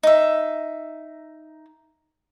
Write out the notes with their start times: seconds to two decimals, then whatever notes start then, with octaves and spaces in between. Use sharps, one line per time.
0.03 D#4 E5